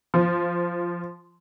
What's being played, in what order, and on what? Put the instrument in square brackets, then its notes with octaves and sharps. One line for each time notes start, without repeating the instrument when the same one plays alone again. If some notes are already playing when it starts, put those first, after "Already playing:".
[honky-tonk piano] F3